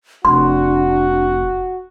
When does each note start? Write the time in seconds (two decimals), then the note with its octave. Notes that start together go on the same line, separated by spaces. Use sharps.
0.25 F1 D4 F#4 C6